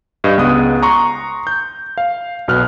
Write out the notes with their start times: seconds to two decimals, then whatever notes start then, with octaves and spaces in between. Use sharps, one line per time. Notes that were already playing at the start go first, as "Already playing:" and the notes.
0.24 G2 D#5
0.38 C#2 B3 G#4 D#6 F#6
0.82 A#5 C6 C#6 D#6
1.47 G6
1.98 F5
2.48 B1 B2 F6 F#6